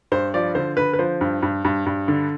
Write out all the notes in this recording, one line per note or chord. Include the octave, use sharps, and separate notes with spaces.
G2 C5
F3 D5
D3 C5
D3 B4
B4
F3 C5
G2
G2
G2
G2
D3